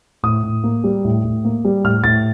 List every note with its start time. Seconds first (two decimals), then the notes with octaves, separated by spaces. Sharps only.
0.23 A2 D#6
0.43 A2
0.64 A#3
0.84 G3
1.05 A2
1.24 A2
1.45 A#3
1.65 G3
1.84 A2 F6
2.04 A2 A6